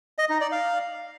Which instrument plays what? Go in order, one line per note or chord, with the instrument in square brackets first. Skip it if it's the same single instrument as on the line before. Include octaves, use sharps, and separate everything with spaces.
[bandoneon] D#5
D#4
D5
F5